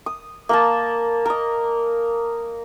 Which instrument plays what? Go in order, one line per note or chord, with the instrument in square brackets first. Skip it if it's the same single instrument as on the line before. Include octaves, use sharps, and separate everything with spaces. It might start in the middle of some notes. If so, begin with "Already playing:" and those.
[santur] D#6
A#3 A#4 A5
A#4 D#5